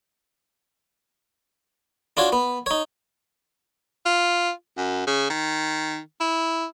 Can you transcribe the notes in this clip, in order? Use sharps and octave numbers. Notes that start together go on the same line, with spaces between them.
D4 F4 F#4 C#5
B3
D#4 C#5
F4
F#2
C#3
D#3
E4